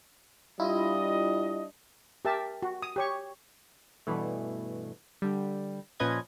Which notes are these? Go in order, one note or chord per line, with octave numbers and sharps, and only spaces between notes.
G3 D4 E4 F4 D#5
G4 A#4 E5 A5
F#4
D#6
G4 C#5 C#6
G2 B2 E3 A3
D3 G3
A#2 F3 C#4 B4 D#5 G#6